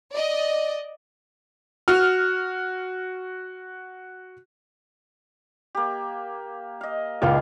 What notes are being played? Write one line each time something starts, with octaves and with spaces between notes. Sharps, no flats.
D5 D#5
F#4 F6
A#3 G4
D#5 F5
C#2 A#2 D#3 E3 F4